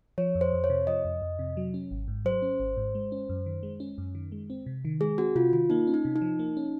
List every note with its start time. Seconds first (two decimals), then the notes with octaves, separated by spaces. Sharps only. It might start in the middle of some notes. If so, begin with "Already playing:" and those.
0.18 F3 C#5
0.35 F2
0.41 C5
0.53 F2
0.64 C#5
0.70 C3
0.87 F3 D#5
1.05 F2
1.22 F2
1.39 C3
1.57 F#3
1.74 C#4
1.91 G#1
2.08 G#2
2.25 F#3 C5
2.42 C#4
2.60 G#1
2.77 G#2
2.95 G#3
3.12 C#4
3.29 F#2
3.46 D#3
3.63 G#3
3.80 C#4
3.98 F#2
4.15 D#3
4.32 G#3
4.50 C4
4.66 C3
4.85 D#3
5.01 G#3 G#4
5.18 C4 F#4
5.35 C3 F4
5.53 D#3 F4
5.70 A#3 D#4
5.87 C#4
5.94 D#4
6.05 C3
6.16 D#4
6.21 F3
6.39 A#3
6.57 C#4